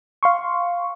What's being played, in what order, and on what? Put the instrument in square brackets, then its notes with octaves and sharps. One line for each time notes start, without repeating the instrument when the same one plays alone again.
[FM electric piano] F5 C6 C#6